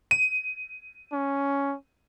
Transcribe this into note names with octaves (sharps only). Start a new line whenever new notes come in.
D#7
C#4